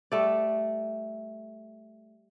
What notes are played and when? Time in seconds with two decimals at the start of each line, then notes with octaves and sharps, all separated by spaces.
0.12 G3 A3 D5